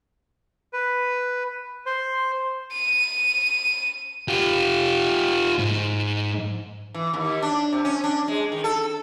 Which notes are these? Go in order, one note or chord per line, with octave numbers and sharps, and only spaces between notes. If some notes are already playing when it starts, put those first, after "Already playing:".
B4
C5
D#7
F4 G4
G#2
E3
D#2
D4
C3
C#4
D4
G#3
D#3
A4